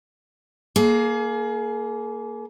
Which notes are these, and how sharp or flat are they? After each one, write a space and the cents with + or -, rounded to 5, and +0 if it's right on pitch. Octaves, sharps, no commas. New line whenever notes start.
A#3 +0 G#4 +30